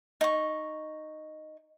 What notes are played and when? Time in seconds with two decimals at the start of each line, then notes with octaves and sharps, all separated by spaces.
0.21 D#4 C#6